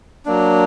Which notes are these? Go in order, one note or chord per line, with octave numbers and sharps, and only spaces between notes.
F#3 A#3 D4